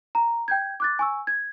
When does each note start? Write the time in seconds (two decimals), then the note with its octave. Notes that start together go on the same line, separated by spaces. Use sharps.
0.15 A#5
0.48 G5 G6 G#6
0.80 D6 F#6 A6
0.99 G#5 C#6 E6
1.27 G#6